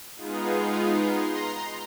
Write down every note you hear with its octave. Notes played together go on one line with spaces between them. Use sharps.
G#3 B3 D#4 F4 G#4
A#5 C6